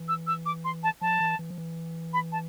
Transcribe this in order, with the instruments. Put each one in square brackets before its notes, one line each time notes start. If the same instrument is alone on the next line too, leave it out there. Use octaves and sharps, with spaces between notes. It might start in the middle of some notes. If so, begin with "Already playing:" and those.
Already playing: [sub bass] E3
[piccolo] E6
E6
D6
C6
A5
[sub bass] F3 [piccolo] A5
[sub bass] E3
E3
F3
E3
[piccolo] B5
A5